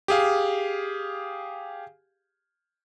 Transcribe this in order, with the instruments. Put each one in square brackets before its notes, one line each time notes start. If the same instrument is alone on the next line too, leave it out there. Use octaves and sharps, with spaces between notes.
[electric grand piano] G4 G#4 F5